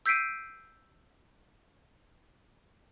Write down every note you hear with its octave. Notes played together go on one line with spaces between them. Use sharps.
E6 G6 B6 C7 D7 D#7